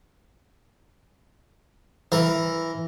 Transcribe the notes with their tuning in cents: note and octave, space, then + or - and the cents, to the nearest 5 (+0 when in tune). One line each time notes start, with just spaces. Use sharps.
E3 +0 A#4 +0